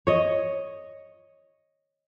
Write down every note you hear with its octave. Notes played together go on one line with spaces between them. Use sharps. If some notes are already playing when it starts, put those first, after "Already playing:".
C#5 D#5